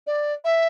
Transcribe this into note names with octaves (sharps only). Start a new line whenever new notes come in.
D5
E5